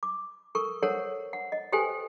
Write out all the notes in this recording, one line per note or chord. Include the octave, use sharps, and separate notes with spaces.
D6
A4 A#4 C#6
A4 A#4 C5 C#5 F#5
F#5
D#5
G4 A4 B4 C5 G5 G#5